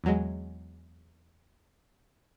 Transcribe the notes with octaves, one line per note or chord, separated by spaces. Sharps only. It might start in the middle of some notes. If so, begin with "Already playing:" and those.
E2 F#3 G#3